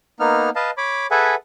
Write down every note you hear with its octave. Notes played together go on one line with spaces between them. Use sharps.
A#3 B3 D#4 F6
B4 D#5 F5 A5
C#5 B5 D6
G#4 A4 B4 E5 F#5 G#5